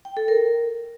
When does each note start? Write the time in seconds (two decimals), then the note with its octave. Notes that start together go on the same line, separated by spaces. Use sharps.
0.05 G5
0.17 A4
0.28 A#4